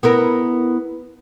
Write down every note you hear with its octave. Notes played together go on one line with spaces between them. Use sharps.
B3 E4 A#4